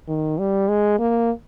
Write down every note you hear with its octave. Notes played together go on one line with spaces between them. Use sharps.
D#3
G3
G#3
A#3